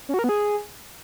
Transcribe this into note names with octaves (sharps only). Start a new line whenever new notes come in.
C#4
F#4
A#4
B3
G#4